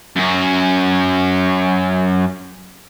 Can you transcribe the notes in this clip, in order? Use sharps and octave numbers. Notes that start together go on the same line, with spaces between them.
F#2 C#4